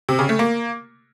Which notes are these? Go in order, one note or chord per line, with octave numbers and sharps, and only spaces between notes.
C3
C#3
A3
A#3